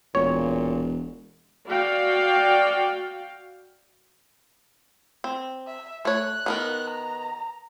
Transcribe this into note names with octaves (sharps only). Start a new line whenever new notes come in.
E1 A#2 C#5
F#4 D5 F5 G5
C4
E5
A3 C#5 F#6
D#3 B3 A#4
A#5